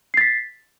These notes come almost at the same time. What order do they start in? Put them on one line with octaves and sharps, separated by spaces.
C7 A6 B6